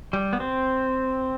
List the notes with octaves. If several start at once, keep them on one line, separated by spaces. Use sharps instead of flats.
G3
B3
C4